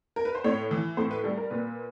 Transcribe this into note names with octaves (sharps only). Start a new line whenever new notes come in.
A#4
B4
C5
A2 C#5
E3
A2 C5
B4
G3 A4
A#4
A#2 B4